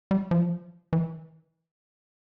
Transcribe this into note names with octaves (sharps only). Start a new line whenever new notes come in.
G3
F3
E3